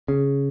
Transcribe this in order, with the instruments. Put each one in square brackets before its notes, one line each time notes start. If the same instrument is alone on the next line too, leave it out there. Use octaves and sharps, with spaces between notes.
[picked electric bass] C#3